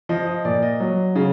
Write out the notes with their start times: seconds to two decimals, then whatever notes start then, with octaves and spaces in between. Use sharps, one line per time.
0.09 F3 D#5
0.27 D#5
0.45 A#2 D5
0.62 D#5
0.80 F#3
1.15 C#3